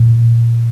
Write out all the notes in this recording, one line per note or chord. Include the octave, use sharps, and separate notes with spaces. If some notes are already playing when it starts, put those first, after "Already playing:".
Already playing: A#2